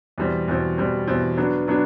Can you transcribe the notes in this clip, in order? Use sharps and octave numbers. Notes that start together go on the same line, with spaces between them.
E2 B2 G3 C4
E2 B2 G3 C4
E2 B2 G3 C4
E2 B2 G3 C4
F#3 B3 D4
F#3 B3 D4